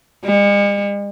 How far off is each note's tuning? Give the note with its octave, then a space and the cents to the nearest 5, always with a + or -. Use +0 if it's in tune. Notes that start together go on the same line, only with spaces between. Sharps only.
G#3 -45